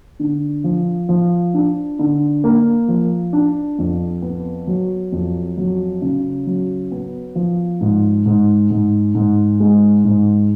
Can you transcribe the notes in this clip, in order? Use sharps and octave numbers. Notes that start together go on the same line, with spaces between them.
D3
F3
F3
D4
D3
A#3
F3
D4
F2
B3
F#3
F2
F#3
C#3
F#3
B3
F3
G#2
G#2
G#2
G#2
G#3
G#2